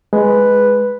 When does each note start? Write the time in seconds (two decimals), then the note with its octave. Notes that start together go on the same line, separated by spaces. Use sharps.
0.13 G#3 B4